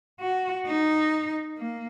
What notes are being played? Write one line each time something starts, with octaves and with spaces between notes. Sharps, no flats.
F#4
D#4
A#3